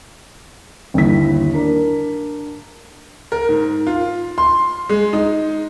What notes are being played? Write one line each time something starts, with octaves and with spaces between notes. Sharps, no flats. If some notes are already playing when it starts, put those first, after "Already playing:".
G1 D#2 E4 B6
D4 A#4
A#4
G#2
F4
C6
G#3
D#4